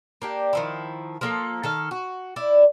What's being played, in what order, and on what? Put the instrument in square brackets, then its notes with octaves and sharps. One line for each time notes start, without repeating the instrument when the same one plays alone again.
[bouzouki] A#3 D4 G4
D#3 F3 E4
F3 A#3 A4
D#3 A4 F5
F#4
E4 D5